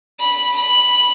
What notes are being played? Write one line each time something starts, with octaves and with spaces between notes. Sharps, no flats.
B5
B5